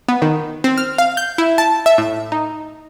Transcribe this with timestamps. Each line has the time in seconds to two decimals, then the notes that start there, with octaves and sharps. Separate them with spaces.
0.08 B3
0.22 D#3
0.64 C4
0.78 F6
0.98 F5
1.17 G6
1.38 E4
1.58 A5
1.86 E5
1.98 A2
2.32 D#4